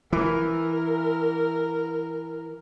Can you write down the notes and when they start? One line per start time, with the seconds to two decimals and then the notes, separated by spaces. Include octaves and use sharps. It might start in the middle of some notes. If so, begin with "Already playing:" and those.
0.13 E3 A#4